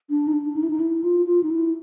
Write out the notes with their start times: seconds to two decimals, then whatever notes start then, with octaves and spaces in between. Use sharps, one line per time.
0.10 D4
0.27 D#4
0.33 D4
0.56 D#4
0.63 E4
0.70 D#4
0.80 E4
1.04 F4
1.27 F4
1.43 D#4
1.50 E4